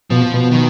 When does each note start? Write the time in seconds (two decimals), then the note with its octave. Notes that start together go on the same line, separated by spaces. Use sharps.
0.10 B2 F3
0.34 B2
0.51 D#3